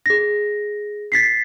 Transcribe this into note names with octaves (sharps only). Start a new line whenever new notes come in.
G#4 A#6
A6 B6 C7